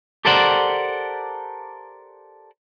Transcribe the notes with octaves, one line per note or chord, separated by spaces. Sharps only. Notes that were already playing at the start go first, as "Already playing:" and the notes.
G4 A4 A#4 C5 D5 F#5